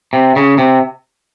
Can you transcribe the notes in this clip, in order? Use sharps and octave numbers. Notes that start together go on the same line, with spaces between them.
C3
C#3
C3